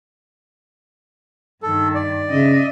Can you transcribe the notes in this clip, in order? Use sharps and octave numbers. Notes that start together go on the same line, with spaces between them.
G2 D#3 A4
D5
C#3 D#5 E5